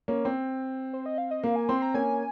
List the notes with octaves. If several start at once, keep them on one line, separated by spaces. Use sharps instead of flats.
A#3 C#4
C4
C5
D#5
F5
D#5
A#3 F5
G#5
C4 C6
A#5
A#3 C#4 G#5